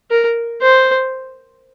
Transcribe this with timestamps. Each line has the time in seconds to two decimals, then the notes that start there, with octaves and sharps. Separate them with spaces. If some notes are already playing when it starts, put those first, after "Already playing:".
0.11 A#4
0.62 C5